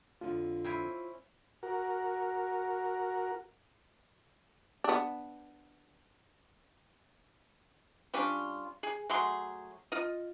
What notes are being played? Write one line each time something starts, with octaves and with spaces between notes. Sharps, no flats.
F2 D3 D4 F4
C4 C#4 E4
F#4 A#4
B3 D4
G3 C#4 D4 F4
G#4
F#3 A3 G#4 C6
F4 D#5